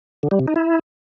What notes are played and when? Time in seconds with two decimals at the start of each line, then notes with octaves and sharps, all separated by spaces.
0.23 D3
0.31 G3
0.39 C3
0.48 D#4
0.56 E4